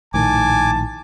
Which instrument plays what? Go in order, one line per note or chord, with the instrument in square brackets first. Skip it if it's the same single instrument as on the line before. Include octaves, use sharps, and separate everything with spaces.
[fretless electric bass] A#1 A2 D#3 [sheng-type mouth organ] G#5 D6 [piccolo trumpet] A5